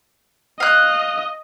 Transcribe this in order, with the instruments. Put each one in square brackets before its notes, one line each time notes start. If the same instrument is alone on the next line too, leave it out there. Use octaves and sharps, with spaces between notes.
[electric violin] D#5 [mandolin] F5 F#6